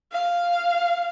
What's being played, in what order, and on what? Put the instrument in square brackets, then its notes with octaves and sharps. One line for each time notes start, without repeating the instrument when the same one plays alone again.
[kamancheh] F5